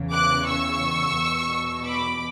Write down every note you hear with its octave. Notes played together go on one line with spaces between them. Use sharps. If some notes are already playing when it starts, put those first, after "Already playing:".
Already playing: E2 C#3 E3
D6 F#6
C#6 E6
E2 B2
B5 D6